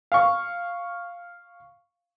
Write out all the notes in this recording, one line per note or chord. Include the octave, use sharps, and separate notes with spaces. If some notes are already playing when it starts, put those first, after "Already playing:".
F5 C#6